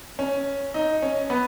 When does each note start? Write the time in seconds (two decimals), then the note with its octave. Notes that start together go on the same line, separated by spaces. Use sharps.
0.19 C#4
0.74 D#4
1.02 C#4
1.30 B3